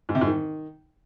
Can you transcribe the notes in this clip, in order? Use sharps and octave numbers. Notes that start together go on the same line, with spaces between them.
G#2
C3
G#2
D#3